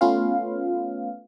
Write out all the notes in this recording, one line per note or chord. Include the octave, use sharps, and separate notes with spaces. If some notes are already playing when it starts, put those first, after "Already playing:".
A3 B3 C#4 F4 B4 F5